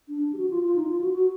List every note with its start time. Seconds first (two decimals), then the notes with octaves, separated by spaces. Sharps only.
0.09 D4
0.33 G4
0.38 F#4
0.50 F4
0.63 F4
0.76 D#4
0.88 F4
1.01 F#4
1.14 F#4